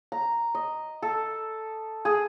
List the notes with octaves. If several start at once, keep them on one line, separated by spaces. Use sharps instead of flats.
A#5
D#5
A4
G#4